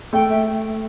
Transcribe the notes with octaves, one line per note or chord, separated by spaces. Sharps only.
A3 G5
E5